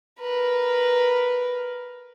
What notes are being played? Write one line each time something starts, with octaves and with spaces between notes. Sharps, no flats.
A#4 B4